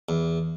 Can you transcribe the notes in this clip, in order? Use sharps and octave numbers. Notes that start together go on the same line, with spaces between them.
E2